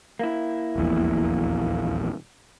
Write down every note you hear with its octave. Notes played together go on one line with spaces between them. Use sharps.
A#3 E4
D#1 A#1 E2